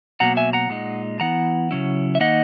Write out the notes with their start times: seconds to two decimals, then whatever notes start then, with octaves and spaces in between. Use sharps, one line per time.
0.20 B2 F#3 A#3 F#5 A#5
0.37 E5 G#5
0.53 F#5 A#5
0.70 A#2 G#3 D#4
1.20 E3 B3 E4 F#5 A#5
1.71 C#3 F#3 C#4 E4
2.15 E5
2.20 D#3 A#3 D#4 D#5 F#5